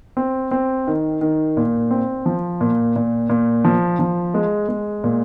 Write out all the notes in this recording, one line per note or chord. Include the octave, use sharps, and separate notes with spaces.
C4
C4
D#3
D#3
A#2
C4
F3
A#2
A#2
A#2
F3
F3
G#3
G#3
A#2